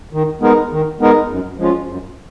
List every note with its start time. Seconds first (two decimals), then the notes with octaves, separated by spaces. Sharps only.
0.13 D#3
0.41 G#3 B3 D#4 A#4
0.72 D#3
1.00 G#3 B3 D#4 A#4
1.30 F#2
1.58 F3 G#3 C#4 F4
1.87 F#2